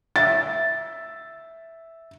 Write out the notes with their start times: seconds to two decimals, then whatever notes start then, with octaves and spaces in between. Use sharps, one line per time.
0.16 E5 A6